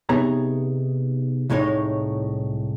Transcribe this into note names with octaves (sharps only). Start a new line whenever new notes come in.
C3 B3 D#4 G#4 C#5 A#5
C2 A2 G#3 D#4 C#5